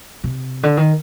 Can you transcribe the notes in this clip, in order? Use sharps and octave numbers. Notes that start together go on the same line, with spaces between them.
C3
D3
D#3